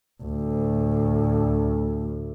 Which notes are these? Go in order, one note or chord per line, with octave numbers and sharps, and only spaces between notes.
D2 A2